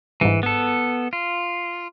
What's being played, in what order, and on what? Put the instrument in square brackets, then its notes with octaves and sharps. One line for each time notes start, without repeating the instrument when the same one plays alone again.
[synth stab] G1 G#2 [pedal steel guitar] E3
[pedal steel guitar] B3 A4
F4